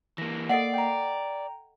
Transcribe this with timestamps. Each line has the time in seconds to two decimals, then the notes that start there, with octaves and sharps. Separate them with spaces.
0.18 E3 A#3 A#6
0.49 A#3 A4 D5 D#5 F#5 C7 D7
0.74 G5 A#5